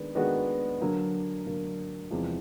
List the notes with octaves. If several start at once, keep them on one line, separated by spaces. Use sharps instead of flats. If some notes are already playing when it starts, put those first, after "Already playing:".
Already playing: D#3 G#3 B3 D4
D#3 G#3 B3 D4 F#4
D3 F#3 A#3
D3 F#3 A#3
E2 C3 F3 G#3